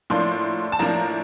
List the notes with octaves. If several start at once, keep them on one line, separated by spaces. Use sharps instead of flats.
A2 F3 A#3 D4 C6
A5
A2 F3 A#3 D4 A#5